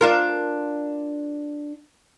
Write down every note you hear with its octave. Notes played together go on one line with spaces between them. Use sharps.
D4 F4 A#4